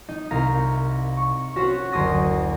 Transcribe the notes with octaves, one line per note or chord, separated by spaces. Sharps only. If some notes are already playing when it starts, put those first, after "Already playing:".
D#4
C2 F5 A#5
C#6
C#4 F#4 C5 C#5 F#5
F#1 D2 C6 D#6 A#6